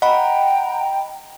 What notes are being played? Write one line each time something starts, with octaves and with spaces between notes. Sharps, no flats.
D#5 F#5 G5 A#5 B5